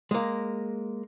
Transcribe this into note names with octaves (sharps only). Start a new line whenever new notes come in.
G#3 A#3